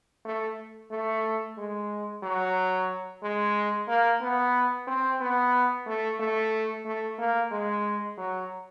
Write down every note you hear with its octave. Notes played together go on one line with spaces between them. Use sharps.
A3
A3
G#3
F#3
G#3
A#3
B3
C4
B3
A3
A3
A3
A#3
G#3
F#3